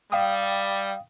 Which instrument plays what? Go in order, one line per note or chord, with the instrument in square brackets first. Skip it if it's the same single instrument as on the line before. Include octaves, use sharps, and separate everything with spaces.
[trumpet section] G3 [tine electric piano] F5 G5 D#6